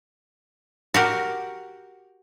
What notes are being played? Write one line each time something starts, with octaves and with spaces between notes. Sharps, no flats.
F#4 G4 A#4